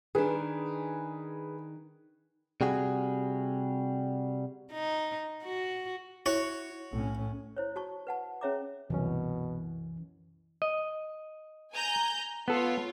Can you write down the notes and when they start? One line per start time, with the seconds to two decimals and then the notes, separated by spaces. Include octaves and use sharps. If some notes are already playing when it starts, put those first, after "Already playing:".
0.15 D#3 D4 G#4 B4
2.61 C3 G3 F#4 G#4
4.73 D#4
5.44 F#4
6.26 E4 F#4 C#5 F#5
6.93 B1 A2 C#4
7.57 E4 C5 C#5
7.76 F#4 A5 C#6
8.07 B4 F#5 A5
8.41 C#4 G#4 C#5 E5 A#5 D6
8.90 C2 F#2 B2 E3 C#4
10.62 D#5
11.72 G#5 A#5 G6
12.48 B3 F4 A4 C#5